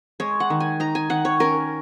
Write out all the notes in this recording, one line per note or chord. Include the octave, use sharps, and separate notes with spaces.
G#3 C#5
F#5
D#3
G#5
D#4 A#5
G#5
D#3 F#5
C#5
C#4 A#4